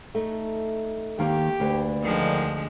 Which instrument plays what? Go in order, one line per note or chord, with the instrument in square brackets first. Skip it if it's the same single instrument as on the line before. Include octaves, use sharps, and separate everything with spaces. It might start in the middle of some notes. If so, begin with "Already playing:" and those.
[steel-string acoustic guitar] A3 D#4
[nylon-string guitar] D#2 D#3 A#3 [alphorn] G4
[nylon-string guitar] D2 [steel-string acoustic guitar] A#3 D4 B4
[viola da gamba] D3 F3 G#3 [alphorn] D#3